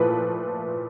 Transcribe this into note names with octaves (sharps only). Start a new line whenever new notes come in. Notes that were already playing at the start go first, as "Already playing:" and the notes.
Already playing: A#2 F3 A3 E4 B4